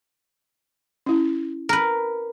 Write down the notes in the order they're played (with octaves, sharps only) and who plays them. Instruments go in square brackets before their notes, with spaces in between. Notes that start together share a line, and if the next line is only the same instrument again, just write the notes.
[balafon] C#4 E4
[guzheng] A#4 B4